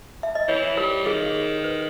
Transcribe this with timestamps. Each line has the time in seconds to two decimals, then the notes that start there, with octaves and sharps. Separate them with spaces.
0.23 E5
0.35 D#5
0.48 E3 C#5
0.77 G3 A#4
1.06 D#3 G#4
1.64 B4